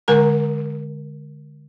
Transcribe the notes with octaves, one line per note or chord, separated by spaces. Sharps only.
D3 G#3 A#4 G#5 A#5